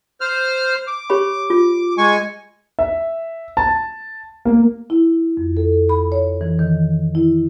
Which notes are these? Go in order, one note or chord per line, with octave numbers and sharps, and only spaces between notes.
C5 F6
D6
G4 C#5 B5
F4
G#3 G#5 C#6
E5
A5
A#3
E4
F2
A4
B5
C#5
E3
D#3
E4